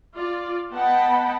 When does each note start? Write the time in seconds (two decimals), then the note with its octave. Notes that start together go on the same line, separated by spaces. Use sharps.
0.14 F4 D5
0.72 B3 D#5 F#5 G5 A5 B5